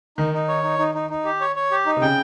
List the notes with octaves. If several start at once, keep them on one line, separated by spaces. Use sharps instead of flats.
D#3 D#4
D#4
C#5
D#4
D#4
D#4
D#4
G4
C#5
C#5
G4
D#4
C3
C#3 G5